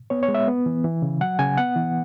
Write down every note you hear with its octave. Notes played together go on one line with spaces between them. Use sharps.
B3 C#5
C#5
G#3
E5
B3
E3
E3
C#3
F#3 F#5
C#3 G#5
B3 F#5
E3